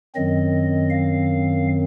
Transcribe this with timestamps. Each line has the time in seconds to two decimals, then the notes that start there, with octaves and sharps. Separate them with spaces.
0.15 F#2 D#3 F#3 C4 D#5
0.90 F5